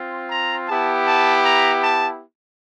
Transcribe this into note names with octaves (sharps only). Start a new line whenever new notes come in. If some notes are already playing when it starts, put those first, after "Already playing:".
Already playing: C4 F4
A#5
B3 E4 G4 A5
A5
A#5
A5